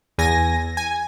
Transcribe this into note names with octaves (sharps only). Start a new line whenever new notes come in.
E2 G#5 A#6
G#5